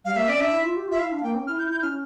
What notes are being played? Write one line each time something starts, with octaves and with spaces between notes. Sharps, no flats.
G3 F5
A#3 E5
C#4 D5
D4 E5
E4
F4
G4
F4 E5
E4 F5
D4
F5
A#3 G5
C#4
E4 F6
E4 G6
E4 G6
C#4 F6